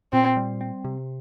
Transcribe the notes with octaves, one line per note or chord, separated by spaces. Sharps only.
A#2 C4
G3
C4
C3